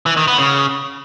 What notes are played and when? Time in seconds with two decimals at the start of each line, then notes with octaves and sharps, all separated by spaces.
0.06 E3
0.17 D#3
0.28 B3
0.38 C#3